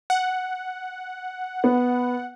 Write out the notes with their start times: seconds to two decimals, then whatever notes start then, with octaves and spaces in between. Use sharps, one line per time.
0.10 F#5
1.64 B3